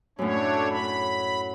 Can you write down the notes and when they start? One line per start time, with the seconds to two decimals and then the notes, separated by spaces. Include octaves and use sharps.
0.19 F#2 A2 A3 D4 C#5
0.70 B5